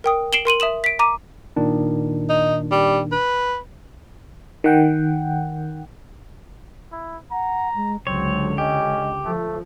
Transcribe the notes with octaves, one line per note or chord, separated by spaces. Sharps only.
A#4 G5 D#6
C7 D7 E7 F#7 G7
A#4 C6 D#7 F#7
E5 D#6 E7 F#7
B6 D7
A#5 D6 D#7
A#2 D#3 D4
D#4
G3
B4
D#3 F#5 G5
E4
F#5 A#5
G#3
C#2 D3 F#3 C4 C#5
C#4 G4 D#5
F3 A3 A4